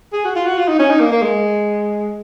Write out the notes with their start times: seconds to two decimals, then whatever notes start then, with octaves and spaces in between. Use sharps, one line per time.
0.13 G#4
0.25 F#4
0.36 F4
0.46 F#4
0.57 F4
0.68 D#4
0.79 C#4
0.90 D#4
1.00 A#3
1.12 A#3
1.22 G#3